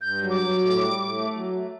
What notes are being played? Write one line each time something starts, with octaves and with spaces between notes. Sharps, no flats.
G2 G6
F#3
D6
F#3
A2
G3
A2
A3
F#3
A3